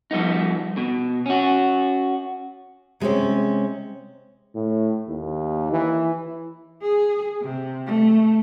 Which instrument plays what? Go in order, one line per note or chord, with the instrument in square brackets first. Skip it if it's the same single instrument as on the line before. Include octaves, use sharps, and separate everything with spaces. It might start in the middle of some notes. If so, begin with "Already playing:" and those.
[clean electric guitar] F3 G3 B3 D#4
B2
C#4 F#4
[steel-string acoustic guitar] C3 G#3 A3 C4 C#4
[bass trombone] A2
D#2
E3
[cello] G#4
C3
A3